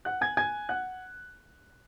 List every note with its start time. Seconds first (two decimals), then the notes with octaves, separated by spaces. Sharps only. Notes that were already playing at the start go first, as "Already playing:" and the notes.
0.05 F#5 F#6
0.21 G#5 G#6
0.37 G#5 G#6
0.69 F#5 F#6